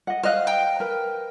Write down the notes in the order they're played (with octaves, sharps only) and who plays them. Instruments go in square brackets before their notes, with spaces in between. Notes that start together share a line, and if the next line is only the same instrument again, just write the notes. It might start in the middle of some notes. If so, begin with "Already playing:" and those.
[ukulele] D#5 F#5
[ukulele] C5 D#5 F5 [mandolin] F6 F#6
[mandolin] G5
[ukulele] A#4 B4